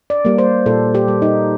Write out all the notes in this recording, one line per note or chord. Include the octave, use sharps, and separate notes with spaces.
D5
G3 A#3
C5
A#2 A4
G4
G3 A#3
D#4